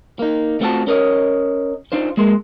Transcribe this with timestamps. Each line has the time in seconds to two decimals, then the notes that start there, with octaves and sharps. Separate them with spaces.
0.19 A#3 D#4
0.61 A3 C4 F4 F#4 E5 A5
0.87 C#4 A#4 C#5 D#5
1.92 D4 D#4 F4 C5
2.17 G#3 A#3 G#4 C6